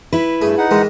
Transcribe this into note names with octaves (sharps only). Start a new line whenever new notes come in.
E4 B4
G2 A3 G#4
D#4 F#5
D#3 E3 G#3